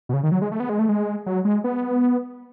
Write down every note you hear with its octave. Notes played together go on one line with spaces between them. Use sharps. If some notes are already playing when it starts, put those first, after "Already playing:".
B2
C#3
D#3
F#3
G#3
A3
B3
G#3
A3
G#3
F#3
G#3
B3